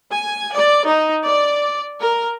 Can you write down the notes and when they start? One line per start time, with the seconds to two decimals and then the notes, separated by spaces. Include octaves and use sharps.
0.13 G#5
0.53 D5
0.87 D#4
1.25 D5
2.00 A#4